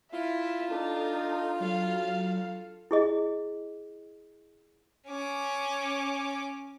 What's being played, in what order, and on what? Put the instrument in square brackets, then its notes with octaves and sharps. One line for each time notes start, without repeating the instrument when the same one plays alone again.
[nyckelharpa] E4 [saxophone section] F4 [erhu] E5
[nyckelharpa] D4 [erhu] D#4 [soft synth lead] A4
[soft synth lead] F#3 [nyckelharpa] A4 [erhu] F5
[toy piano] E4 G#4 D#5
[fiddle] C#4 D6